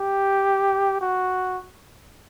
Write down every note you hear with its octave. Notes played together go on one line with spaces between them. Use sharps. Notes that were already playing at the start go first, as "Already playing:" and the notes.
Already playing: G4
F#4